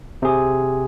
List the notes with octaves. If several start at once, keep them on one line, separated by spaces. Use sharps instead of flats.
C3 G#4